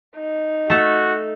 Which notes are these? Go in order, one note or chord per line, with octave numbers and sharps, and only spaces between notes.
D#4
A3 F#4 A4